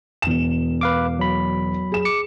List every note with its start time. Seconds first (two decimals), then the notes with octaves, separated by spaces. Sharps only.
0.22 E1 E7
0.81 B4 F5 D6
1.19 F#3 B5
1.92 G#4 E7
2.05 D6 C#7